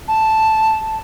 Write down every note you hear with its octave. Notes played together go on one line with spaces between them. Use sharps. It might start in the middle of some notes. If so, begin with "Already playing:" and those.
A5